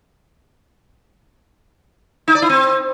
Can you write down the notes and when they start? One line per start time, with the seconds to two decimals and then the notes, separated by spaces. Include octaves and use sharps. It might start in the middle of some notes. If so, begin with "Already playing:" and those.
2.28 D#4
2.35 D5
2.42 E4
2.49 C4